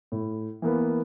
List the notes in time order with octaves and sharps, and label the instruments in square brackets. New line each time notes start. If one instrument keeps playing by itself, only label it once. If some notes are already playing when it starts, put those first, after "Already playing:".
[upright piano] A2
E3 A#3 B3